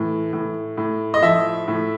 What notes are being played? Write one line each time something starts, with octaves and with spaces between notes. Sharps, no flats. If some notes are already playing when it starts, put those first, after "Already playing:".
Already playing: A2 E3
A2
A2
D#5
F3 E5
A2